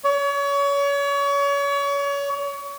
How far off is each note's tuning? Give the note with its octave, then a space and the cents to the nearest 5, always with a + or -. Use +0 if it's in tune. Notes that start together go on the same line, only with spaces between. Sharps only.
C#5 +30